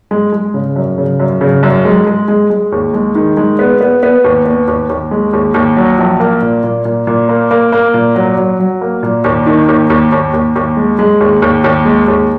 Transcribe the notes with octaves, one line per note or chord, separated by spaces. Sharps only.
G#3
G#3
C#3
F#2
C#3
F#2
C#3
F#2
G#3
G#3
G#3
G#3
D#2
G#3
D#3
G#3
B3
B3
B3
D#2
B3
D#2
D#2
G#3
D#2
D#2
F#3
A#1
A#3
A#2
A#2
A#2
A#2
A#3
A#3
A#3
A#2
F#3
F#3
F#3
A#3
A#2
D#2
D#3
D#2
D#2
D#2
D#2
D#2
G#3
G#3
D#2
D#2
D#2
G#3
D#2